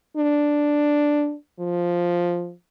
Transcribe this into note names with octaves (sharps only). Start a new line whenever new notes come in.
D4
F3